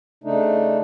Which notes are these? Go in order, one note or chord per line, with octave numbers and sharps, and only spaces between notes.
C#3 A3 D4 D#4